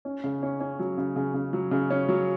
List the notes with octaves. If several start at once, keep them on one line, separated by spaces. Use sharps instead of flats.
C#4
C#3
C#4
C#4
F#3
C#3
C#3
C#3
F#3
C#3
C#4
F#3